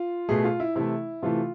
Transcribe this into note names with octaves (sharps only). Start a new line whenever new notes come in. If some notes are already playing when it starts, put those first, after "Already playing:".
Already playing: F4
B2 A3 G#4
F4
E4
C3 E3 A3 E4
C3 E3 A3 F4